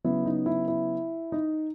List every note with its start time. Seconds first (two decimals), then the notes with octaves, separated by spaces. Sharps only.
0.04 C#3 F#3 B3 E4
0.26 D#4
0.46 E4
0.68 E4
1.32 D#4